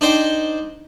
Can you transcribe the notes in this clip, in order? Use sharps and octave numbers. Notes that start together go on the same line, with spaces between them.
D4 D#4 C5 G5